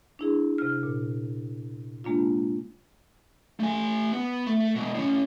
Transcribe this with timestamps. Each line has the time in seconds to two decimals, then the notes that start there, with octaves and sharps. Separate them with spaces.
0.19 D4 E4 G#4
0.58 C3 F6
0.83 A#2
2.04 G#3 A#3 D4 F4
3.60 A3 G#5
4.12 B3
4.46 A3
4.75 B2 G#3
4.94 A2 C#4